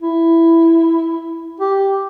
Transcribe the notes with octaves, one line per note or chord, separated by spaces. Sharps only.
E4
G4